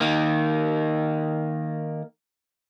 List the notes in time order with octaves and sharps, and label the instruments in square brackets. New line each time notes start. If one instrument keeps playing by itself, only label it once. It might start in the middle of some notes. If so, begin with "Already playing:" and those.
[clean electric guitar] D#3 A#3